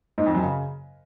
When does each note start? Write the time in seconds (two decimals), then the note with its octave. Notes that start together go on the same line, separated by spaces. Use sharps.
0.18 G#2
0.26 F2
0.35 F#2
0.43 C#3